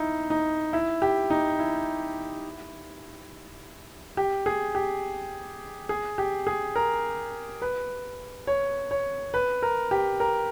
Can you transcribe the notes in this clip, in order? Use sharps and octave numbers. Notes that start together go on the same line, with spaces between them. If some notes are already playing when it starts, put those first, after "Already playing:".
Already playing: D#4 E4
D#4
E4
G4
D#4
E4
G4
G#4
G4
G#4
G4
G#4
A#4
B4
C#5
C#5
B4
A#4
G4
A#4